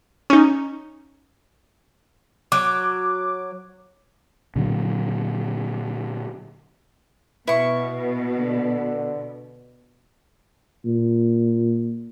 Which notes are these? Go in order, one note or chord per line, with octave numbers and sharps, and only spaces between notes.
C#4 D#4
F#3 D6
A#2 D3 F#3
B2 E4 B4 C#6
D3
A#2